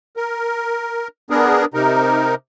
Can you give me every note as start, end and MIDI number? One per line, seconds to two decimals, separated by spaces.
0.17 1.08 70
1.30 1.65 59
1.30 1.65 62
1.30 1.65 68
1.30 1.65 70
1.74 2.35 48
1.74 2.35 63
1.74 2.35 70